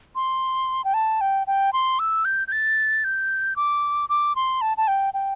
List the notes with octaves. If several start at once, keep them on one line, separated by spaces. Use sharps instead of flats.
C6
G5
A5
G5
G5
C6
E6
G6
G6
A6
G6
D6
D6
C6
A5
A5
G5
G5